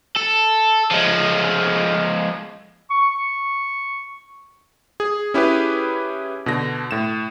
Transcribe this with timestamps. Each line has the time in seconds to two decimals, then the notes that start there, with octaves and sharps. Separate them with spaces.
0.17 A4
0.91 F3 G#3
2.90 C#6
5.00 G#4
5.34 C#4 E4 G4 G#4 B4
6.46 B2 D3 A#6
6.91 A2 E7